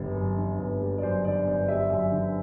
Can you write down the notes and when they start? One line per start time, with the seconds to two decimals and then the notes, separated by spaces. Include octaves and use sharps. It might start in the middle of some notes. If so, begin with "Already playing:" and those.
Already playing: G1 F#2 D3 G3
0.15 F#2
0.37 D3
0.59 G1
0.81 G3
0.98 D5
1.03 F#2 C5
1.25 D3 D5
1.47 G1 D5
1.68 G3 E5
1.90 F#2 E5
2.12 D3